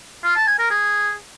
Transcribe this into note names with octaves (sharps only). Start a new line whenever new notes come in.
F4
A5
G#5
A#4
G#4